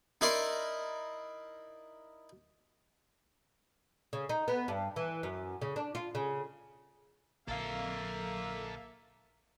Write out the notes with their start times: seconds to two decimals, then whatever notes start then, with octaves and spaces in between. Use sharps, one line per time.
0.21 D#4 E4 A#4 D5 C6
4.13 C#3
4.29 D#4
4.48 B3
4.68 G2
4.96 E3
5.23 F#2
5.62 C#3
5.76 D4
5.95 F4
6.15 C#3
7.48 A#1 D3 A#3 A4 E5 F5